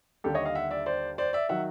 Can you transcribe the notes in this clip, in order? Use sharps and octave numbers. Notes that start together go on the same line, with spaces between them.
D#2 D3 G3 G4 A4
C#5 D#5
D#5 F5
E5 F#5
D5 E5
C5 D5
C5 D5
D5 E5
D#3 F#3 E5 F#5